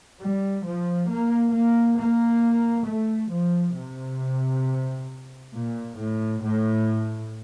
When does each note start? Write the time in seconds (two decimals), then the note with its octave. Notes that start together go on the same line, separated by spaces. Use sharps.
0.22 G3
0.66 F3
1.10 A#3
1.54 A#3
1.99 A#3
2.87 A3
3.32 F3
3.76 C3
5.54 A#2
5.98 A2
6.43 A2